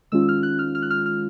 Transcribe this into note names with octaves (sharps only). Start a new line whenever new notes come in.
D#3 G#3 C#4 F4 E6
F6
F#6
F6
F6
F#6
F6
F6